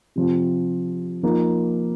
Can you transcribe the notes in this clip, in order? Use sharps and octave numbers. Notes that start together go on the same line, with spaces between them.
C3 F3 C4
F3 A#3 D#4